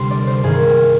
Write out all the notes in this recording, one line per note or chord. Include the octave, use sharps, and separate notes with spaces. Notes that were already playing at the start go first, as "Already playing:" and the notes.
Already playing: D2 C3 G3 C6
D5
C5
G2 D#3 A#3 G#4